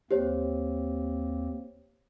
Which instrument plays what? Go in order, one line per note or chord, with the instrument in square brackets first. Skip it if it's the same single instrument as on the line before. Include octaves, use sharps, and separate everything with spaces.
[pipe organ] D#2 A#3 C4 [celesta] G4 C5 C#5